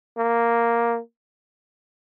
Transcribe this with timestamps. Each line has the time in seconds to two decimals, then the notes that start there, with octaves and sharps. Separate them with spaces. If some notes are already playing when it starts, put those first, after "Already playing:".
0.17 A#3